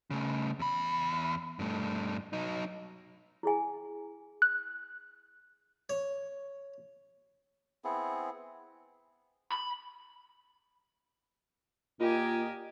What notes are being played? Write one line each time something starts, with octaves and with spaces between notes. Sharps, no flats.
C#3 A3
E2 B5
G2 A3
F#3 D#4
E4 G#4 G#5
F#6
C#5
B3 C4 E4 G#4
B5
A#2 F4 G4 A#4 D#5 G#5